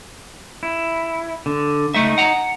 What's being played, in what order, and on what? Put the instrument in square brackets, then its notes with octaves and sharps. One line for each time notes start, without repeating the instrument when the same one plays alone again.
[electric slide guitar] E4
D3
[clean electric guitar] C#2 A3 E5 [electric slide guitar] D#4
[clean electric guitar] F#5 A#5